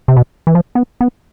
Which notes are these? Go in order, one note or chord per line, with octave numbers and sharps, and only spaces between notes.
C3
B2
E3
F3
B3
B3